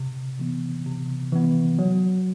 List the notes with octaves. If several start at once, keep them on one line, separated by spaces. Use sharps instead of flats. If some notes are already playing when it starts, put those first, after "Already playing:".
Already playing: C3
E3 B3
C3
E3 B3
F#3